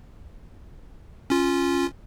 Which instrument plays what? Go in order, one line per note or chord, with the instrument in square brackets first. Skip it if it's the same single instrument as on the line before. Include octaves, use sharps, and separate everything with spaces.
[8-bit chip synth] C#4 F4